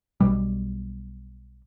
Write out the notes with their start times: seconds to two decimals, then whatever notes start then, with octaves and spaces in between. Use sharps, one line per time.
0.20 B1 B2 G3